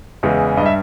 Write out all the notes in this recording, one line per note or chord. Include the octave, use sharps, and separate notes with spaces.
E2 C#3 E3 G#3
G2 G3 D#5
E5